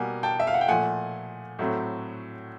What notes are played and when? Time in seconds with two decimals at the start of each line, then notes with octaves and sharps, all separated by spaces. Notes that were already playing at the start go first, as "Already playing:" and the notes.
Already playing: B2 G3 A#3 F#5 G#5
0.23 G5 A5
0.40 E5
0.47 F5
0.54 F#5
0.61 G5
0.68 A#2 F3 A3 F#5 G#5
1.59 A2 F#3 A3 C4